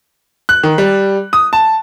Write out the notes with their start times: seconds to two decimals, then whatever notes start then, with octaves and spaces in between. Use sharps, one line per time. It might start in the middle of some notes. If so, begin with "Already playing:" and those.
0.49 F#6
0.63 D#3
0.78 G3
1.33 D#6
1.53 A5